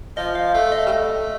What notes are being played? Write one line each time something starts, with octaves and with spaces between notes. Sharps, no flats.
F3 D#5
F5
A3 F5
D#5
G3
A3